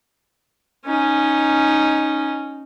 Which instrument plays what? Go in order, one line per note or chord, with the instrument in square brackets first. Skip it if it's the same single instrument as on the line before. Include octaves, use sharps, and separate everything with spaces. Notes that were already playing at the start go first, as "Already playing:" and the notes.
[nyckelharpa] C#4 D#4